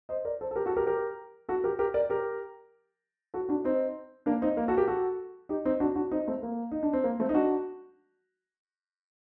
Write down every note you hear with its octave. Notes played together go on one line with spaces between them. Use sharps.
C5 D#5
A#4 D5
A4 C5
A4
G4 A#4
F#4 A4
G4 A#4
G4 A#4
F#4 A4
G4 A#4
G4 A#4
A#4 D5
G4 A#4
F#4 A4
D4 F#4
C4 D#4
A#3 D4
C4 D#4
A#3
F#4 A4
G4 A#4
F#4 A4
D#4 G4
C4 D#4
D4 F#4
D4 F#4
C4 D#4
A3 C4
A#3
D#4
D4
C4
A#3
A3 C4
D#4
D4 F#4